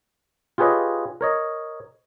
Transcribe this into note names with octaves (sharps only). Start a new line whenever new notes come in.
F4 G4 G#4 B4 C#5 D#5
A#4 C#5 D#5